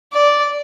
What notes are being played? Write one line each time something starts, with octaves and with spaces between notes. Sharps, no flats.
D5